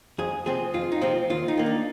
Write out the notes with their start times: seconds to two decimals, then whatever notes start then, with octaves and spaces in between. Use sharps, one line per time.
0.18 F2 G#4
0.46 C3 F3 C4 G#4
0.74 F2 F4
0.92 D#4
1.01 C3 F3 C4 F4
1.30 D#2 F4
1.48 D#4
1.58 D#3 A#3
1.66 D4